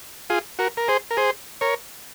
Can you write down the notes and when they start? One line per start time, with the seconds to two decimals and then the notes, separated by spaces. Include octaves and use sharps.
0.30 F4 G#4
0.59 F#4 A#4
0.77 A#4
0.88 G#4 C5
1.11 A#4
1.17 G#4 C5
1.61 A#4 C#5